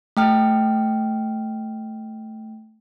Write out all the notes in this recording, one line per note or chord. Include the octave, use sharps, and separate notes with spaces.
A3 G5 F6